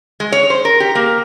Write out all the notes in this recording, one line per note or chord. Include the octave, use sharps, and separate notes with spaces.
G#3
C#5
C5
A#4
G4
A#3